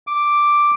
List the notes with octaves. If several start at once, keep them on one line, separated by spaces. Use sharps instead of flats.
D6